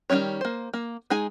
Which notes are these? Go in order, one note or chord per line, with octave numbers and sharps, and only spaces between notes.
D#3 G3 A3 C#4 C#5
A#3 C5
A#3
G#3 D#4 G#4 G#5